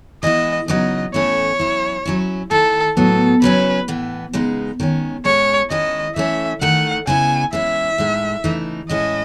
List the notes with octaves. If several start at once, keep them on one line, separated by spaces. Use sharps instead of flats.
E3 G#3 B3 E4 D#5
C#3 F#3 B3 D#4 D#5
A2 E3 A3 C#4 E4 C#5
F#3 C#4 E4
F#3 C#4 E4
D#3 A3 E4 A4
A2 F#3 B3 A4
C#3 F#3 C#4 E4 B4
A2 E3 B3
C#3 G#3 B3 D#4
D#3 G#3 C#4
A2 G#3 C#4 C#5
D#3 G#3 C#4 E4 D#5
E3 A3 C#4 E5
D#3 A3 D#4 F#5
C#3 G#3 B3 E4 G#5
E3 G#3 C#4 E4 E5
A2 G#3 D#4
C#3 E3 A3 D#4
A2 G#3 C#4 E4 D#5